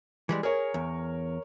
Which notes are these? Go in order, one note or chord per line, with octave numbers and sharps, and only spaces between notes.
E3 G3 G#3
G#4 A#4 C#5
E2